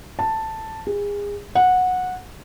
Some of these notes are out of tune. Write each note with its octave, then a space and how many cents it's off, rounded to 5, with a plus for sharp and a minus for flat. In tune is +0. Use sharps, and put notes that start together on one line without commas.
A5 +5
G#4 -30
F#5 -15